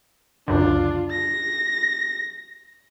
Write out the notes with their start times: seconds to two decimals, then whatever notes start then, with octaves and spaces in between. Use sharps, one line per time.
0.48 C#2 F#2 D3 D4 F4
1.11 A#6